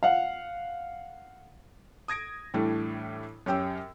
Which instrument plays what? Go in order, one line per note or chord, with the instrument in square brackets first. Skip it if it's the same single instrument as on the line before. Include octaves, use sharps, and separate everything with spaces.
[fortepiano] F5 F#5
[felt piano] D#6 G#6 A#6 D7
A2 E3 G3 A3 D4
F#2 C#4 G4 G5 E6